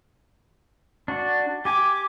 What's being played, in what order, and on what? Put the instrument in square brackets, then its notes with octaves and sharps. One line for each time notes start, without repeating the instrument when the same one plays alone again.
[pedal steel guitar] D4 F#4
[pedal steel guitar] G4 G#5 [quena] D6